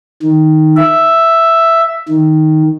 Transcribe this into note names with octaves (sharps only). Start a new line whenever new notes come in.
D#3
E5
D#3